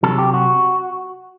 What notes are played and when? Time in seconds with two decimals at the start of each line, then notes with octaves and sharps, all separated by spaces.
0.03 C3 F#3 A4
0.19 G4
0.34 F#4